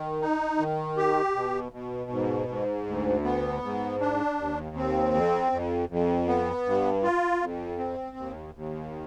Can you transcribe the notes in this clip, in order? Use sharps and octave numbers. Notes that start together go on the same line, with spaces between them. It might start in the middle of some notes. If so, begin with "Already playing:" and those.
Already playing: D#3
D#4
D#3
G4
B2
B2
G#2
G#2
D2
B3
G#2
D4
D#2
C4
F2
F2
F2
B3
G2
F4
F2
C4
D#2
D#2